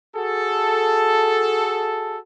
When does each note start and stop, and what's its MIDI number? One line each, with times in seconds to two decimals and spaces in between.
0.16 2.18 66
0.16 2.18 68
0.16 2.18 69